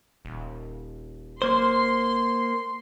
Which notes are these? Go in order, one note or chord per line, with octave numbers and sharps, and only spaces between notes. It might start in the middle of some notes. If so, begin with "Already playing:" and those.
D#1
A#3 C5 C6